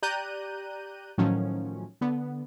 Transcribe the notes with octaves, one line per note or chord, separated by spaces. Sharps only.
G4 D5 A#5 F#6 G6 D#7
A2 D#3 F3 F#3 C#4
D3 B3